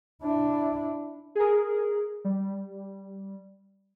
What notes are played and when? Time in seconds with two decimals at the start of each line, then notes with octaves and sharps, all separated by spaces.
0.23 D4 E4
1.35 G#4 A#4
2.25 G3